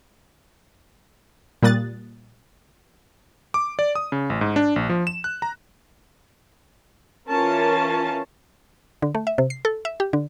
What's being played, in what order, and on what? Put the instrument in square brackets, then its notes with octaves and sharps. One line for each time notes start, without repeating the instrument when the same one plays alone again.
[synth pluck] A#2 G3 A#3 D#6 F#6 A6
[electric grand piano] D6
D5
D#6
C#3
A1
G#2
D4
A#1
F3
E7
F#6
A#5
[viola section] E3 C#4 F4 A#4 A5
[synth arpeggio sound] D3
A3
E5
C3
C7
A4
E5
G4
D3